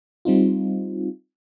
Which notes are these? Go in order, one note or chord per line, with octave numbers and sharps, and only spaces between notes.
G3 C4 D#4 F4